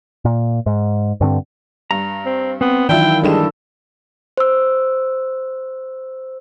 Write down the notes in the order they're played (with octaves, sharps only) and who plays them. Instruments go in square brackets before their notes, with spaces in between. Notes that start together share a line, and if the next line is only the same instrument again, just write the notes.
[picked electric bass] A#2
G#2
G2 D3 C4
[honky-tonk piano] G2 [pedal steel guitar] A#5
[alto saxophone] C4
[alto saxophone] B3 [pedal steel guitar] C4
[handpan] D#3 E3 F#3 [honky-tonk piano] D4 F4 E5 [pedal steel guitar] E4 [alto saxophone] G5
[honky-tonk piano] G2 G4 E7 [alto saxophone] G#3 [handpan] D4 A4 D5
[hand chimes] C5 E6